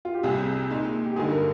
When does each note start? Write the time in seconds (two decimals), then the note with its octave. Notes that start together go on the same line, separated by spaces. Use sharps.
0.05 F4
0.14 G4
0.23 C2 C3 G3 G#4
0.70 A#2 G#3 D#4
1.05 G4
1.16 G2 D3 G#3 D#4 G#4
1.32 A#4